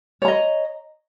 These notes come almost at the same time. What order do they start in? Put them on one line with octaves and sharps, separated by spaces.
C#5 A#5 D#5